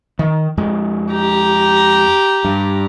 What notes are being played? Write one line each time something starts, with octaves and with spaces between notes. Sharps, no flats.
D#3
F2 G#3
G4 A#5
G2